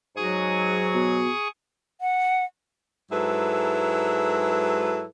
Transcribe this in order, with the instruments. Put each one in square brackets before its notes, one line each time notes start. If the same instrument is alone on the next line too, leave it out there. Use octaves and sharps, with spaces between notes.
[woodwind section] G#2 F#3 F#4 [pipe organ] G#4 C#6 D#6
[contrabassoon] B2
[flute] F#5
[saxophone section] G#2 F#3 E4 G#4 A4 B4